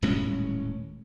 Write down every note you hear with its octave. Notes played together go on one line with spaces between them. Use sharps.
D#1 A2 G#3 C#4